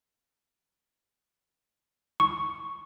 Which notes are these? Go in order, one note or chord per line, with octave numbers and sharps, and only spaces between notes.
C#6